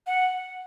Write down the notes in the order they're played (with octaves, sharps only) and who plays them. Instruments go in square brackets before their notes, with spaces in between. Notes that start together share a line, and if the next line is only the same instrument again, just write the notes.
[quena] F#5